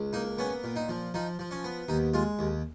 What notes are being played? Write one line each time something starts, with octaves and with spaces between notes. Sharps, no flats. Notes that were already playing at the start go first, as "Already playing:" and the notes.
Already playing: C#2
A#3 D#4
B3 C#4
A#2
D#4
F3
F3 D#4
F3
C#4
B3
D#2 D#4
G#3 F4
D#2